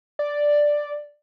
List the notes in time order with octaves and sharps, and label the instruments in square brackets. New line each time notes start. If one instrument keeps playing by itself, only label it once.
[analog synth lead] D5